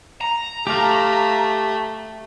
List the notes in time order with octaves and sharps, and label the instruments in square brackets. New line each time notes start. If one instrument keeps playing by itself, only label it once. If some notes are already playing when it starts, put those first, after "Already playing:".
[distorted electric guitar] A#5
[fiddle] A3 [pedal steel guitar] G4 F5